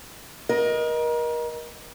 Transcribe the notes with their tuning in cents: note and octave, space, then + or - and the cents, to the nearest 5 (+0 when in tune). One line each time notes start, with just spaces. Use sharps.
A#4 +35 D#5 +0